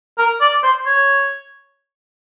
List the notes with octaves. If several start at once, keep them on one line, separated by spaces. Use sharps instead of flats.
A#4
D5
C5
C#5